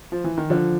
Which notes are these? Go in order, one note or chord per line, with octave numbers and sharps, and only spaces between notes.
F3
E3
D#3
D3 F3